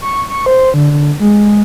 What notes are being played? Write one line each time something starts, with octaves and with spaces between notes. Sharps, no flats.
C#6
C#6
C5
D3
D3
G#3